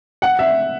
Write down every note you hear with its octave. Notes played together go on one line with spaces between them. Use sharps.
F#5
E5